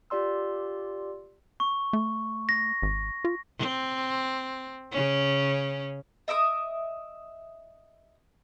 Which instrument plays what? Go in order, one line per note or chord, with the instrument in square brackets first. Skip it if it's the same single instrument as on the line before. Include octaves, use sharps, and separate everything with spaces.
[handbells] F4 G4 D5 C6 E6
[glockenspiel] C#6
[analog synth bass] A3
[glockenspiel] A#6
[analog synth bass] G#1
F4
[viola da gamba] C4
C#3 C#4
[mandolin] D#5 E5 D6 D#6